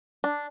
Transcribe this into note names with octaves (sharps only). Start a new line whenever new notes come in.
D4